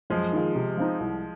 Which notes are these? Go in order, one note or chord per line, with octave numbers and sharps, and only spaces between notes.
F#2 F3 G#3
D#3 A#3 F4 G#4
C3
F3 C4 D#4
C2